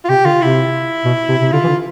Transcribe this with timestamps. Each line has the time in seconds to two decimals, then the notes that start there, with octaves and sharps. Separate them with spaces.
0.04 F4
0.09 C3 G4
0.25 D3 F4
0.42 C3 E4
1.05 B2
1.28 C3
1.42 C3
1.52 D3 F4
1.64 E3
1.68 D3